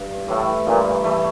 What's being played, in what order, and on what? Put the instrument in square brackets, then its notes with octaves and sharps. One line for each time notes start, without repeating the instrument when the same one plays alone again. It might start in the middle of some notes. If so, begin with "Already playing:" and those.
Already playing: [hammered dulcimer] G2
[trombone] A2 [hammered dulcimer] E3 A3
[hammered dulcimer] G2 [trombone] A#2
[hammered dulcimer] E3 A3